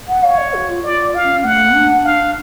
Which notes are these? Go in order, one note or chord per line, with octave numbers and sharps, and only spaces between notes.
F#5
C#5 F5
D5
F#4
F4
F4 D5
F5
C#4
C#4
A3 F#5
D4
F5